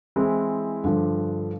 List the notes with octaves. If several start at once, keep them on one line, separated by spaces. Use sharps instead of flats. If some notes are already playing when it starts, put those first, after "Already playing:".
E3 G#3 C4 E4
G2 D3 F3